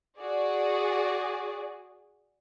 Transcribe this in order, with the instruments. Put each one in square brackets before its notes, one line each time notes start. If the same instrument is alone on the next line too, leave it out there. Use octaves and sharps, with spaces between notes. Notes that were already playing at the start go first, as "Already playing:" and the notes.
[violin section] F#4 G#4 D5